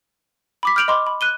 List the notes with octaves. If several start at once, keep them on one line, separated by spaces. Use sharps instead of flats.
B5 D6 B6
F6 G6 D7 F7 F#7
D#5 B5 C6 D6
B5
F#6 D#7 G7